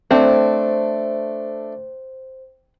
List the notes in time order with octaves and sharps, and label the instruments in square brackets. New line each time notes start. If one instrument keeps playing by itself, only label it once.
[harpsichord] A3 D4 [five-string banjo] C4 [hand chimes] C5